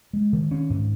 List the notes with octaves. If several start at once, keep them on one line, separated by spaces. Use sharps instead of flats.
G#3
D#3
C#4
G#2